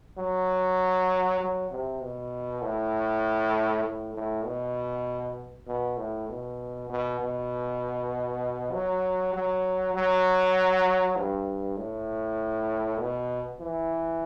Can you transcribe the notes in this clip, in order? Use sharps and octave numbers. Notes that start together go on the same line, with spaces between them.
F#3
F#3
C3
B2
A2
A2
A2
B2
B2
A2
B2
B2
B2
F#3
F#3
F#3
G2
A2
B2
E3